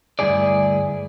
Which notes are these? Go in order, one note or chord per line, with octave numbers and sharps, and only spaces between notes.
D2 G2 E4 G#4 D5